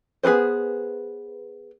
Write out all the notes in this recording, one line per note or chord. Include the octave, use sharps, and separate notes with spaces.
B3 G#4 A4 B4 C5